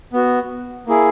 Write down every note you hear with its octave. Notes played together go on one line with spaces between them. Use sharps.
B3 F#4
A#3 E4 G#4